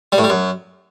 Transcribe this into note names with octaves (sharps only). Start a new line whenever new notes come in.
G3
A2
G3
F#2